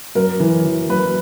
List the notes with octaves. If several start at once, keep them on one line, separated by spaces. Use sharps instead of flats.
F#2 A#4
E3
E3
F#2 B4